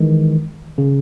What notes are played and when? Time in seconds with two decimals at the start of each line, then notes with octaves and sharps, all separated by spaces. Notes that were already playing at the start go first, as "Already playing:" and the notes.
Already playing: D#3 E3 G#3
0.78 C#3